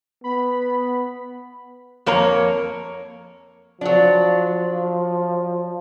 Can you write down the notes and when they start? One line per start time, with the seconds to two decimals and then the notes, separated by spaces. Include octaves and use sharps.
0.24 B3 B5
2.06 F2 A#3 C#5 A#5
3.81 F3 F#3 D4